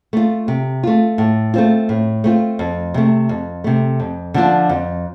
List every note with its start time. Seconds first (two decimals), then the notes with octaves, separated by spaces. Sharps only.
0.13 A3 F4
0.48 C3
0.83 A3 F4
1.18 A2
1.54 A3 C4 F4
1.89 A2
2.24 A3 C4 F4
2.59 F2
2.94 C3 A3
3.29 F2
3.64 C3 A3
4.00 F2
4.34 D3 F3 D4 F4
4.69 F2